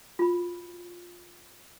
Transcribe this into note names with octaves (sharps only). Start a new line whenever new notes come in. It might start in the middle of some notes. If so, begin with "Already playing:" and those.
F4 F#4 B5